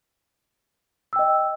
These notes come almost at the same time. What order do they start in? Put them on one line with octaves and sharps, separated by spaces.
E6 G5 D#5